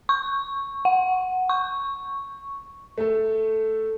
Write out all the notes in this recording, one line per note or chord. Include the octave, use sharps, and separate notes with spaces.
C#6
F#5
C#6
A3 A4